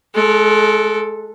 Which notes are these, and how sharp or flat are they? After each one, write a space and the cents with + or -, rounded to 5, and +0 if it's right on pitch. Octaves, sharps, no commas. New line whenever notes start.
G#3 +30 A4 +0